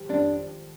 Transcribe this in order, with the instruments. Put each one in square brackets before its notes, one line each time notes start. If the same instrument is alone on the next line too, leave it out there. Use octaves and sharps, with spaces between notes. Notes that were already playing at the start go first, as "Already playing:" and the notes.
Already playing: [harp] G#1 G3
[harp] F2 [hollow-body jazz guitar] D4